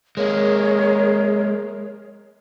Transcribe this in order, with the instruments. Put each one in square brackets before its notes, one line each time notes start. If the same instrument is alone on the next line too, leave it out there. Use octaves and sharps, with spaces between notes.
[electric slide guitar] G#3 A#3 [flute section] G#4 A#4 C#5